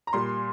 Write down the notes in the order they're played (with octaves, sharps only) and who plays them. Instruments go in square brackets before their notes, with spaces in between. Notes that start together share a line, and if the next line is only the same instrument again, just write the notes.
[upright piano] A#5
A#2 G3 C6